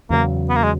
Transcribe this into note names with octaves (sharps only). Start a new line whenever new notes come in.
E2 C#3 F#3 A#3
B3
A#3
G#3